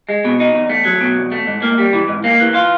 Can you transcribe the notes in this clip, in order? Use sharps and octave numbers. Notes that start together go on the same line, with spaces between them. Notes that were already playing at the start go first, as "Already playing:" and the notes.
G#3
B2
D#4
E2
A3
F#3
B2
E2
A3
G#2
A#3
G3
E3
G#2
A#3
E3
F4